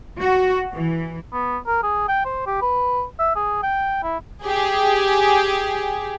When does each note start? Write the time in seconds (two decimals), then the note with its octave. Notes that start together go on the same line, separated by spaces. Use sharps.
0.20 F#4
0.72 E3
1.32 B3
1.67 A#4
1.83 G#4
2.08 G5
2.25 C5
2.47 G4
2.62 B4
3.19 E5
3.36 G#4
3.63 G5
4.03 E4
4.44 G4 G#4